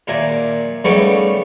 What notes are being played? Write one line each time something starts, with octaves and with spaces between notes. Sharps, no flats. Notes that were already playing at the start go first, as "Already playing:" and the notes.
D#2 A#2 A#4 E5 G#5
C#3 G3 A3 B3 C#4 D#4